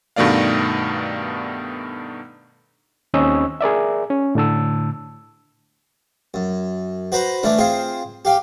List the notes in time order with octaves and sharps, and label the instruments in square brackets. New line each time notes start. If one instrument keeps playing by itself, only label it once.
[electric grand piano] G2 B2 D#3 A3 D5 F5
[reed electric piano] D#2 C4 C#4 D#5 C#6 E6
G#4 A#4 D5 E5
C#4
A2 D3 A5 E6
[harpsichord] F#2
F#4 B4 C5 A#5 B5
E3 A3 C#4 D4
C4 F4 G#4 C5
G4 F5 G5